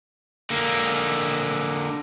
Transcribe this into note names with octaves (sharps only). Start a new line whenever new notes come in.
D3 A#3